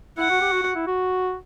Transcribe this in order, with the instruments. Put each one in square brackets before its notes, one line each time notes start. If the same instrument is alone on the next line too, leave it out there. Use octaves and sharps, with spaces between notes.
[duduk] E4 [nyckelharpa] F#5
[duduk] F#4
G4
F#4
F#4
E4
F#4